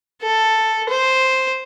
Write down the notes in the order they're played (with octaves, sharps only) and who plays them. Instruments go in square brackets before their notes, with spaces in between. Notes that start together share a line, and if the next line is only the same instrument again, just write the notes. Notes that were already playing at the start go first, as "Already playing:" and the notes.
[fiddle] A4
C5